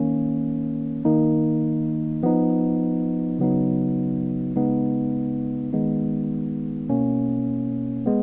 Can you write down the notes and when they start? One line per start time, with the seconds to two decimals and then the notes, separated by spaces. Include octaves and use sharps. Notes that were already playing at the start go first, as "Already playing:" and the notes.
Already playing: D#3 A#3 C#4
1.05 D#3 A#3 D#4
2.23 F3 B3 D#4
3.39 C#3 F#3 B3 D#4
4.56 C#3 G#3 B3 D#4
5.73 D#3 G#3 B3 D#4
6.89 B2 A#3 C#4
8.06 G#3 B3